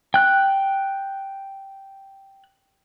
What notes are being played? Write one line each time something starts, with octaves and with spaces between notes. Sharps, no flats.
G5 F#6